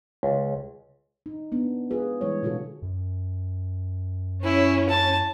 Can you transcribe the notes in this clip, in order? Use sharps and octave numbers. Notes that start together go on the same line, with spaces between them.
C#2
D#4
B3 D4
F4 G#4 B4
E3 G3 G#3 E4 C#5
B2 D3 F4 F#4 A4
F#2
C#4 E4
A5